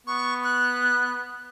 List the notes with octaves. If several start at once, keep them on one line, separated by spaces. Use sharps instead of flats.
B3 C#6
F#6